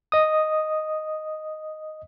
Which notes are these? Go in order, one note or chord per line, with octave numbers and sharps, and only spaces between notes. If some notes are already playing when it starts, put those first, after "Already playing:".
D#5 D#6